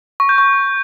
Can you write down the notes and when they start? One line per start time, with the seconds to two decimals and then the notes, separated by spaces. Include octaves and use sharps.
0.20 C#6
0.29 G6
0.38 C#6